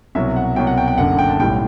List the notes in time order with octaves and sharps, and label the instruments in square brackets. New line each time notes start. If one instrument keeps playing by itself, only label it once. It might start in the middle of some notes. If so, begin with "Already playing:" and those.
[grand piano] C2 B2 F#3 E5
F#5
C2 B2 F#3 G5
F#5
G5
G5
F#1 F#2 D3 F#5
G5
A5
B1 A2 G3 G5